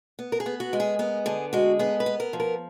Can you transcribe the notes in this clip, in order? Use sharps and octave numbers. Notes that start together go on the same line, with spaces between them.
B3
A#4
G#4
B3
F#4
G#3
G#4
B3 A#4
D3 G#4
G#3 F#4
B3 G#4
B4
B3
A#4
F3
A#4